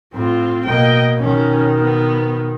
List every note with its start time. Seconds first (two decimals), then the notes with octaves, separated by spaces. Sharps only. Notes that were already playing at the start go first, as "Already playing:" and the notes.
0.13 A2 C4 F4
0.65 B2 A#3 D#5 G5
1.19 B2 D#3 C#4
1.81 B3